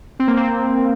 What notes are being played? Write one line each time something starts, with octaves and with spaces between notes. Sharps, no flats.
C4
A#3
C4